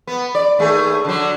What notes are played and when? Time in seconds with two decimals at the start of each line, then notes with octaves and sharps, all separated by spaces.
0.07 B3
0.35 D5
0.59 D#2 A3 G#4
1.05 D3 F#3